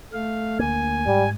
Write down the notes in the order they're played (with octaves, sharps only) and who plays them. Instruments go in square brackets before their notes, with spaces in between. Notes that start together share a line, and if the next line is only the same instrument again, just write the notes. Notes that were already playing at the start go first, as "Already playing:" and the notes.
[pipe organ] A3 F5
[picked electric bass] D2 A#3 [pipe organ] G#5
[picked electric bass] G#2 [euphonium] G3